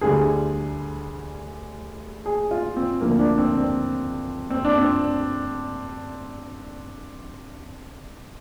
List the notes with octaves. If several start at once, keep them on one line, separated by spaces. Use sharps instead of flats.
D2 D3 G3 G#4
G#4
F4
C4
D2 D3 F3 A#3
D4
C4
C4
C4
D4
C4